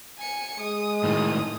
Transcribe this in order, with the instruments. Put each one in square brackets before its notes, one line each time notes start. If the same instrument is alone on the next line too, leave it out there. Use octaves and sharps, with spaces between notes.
[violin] G#5 C#7
[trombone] G#3 [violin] D#6
[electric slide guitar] A2 D#3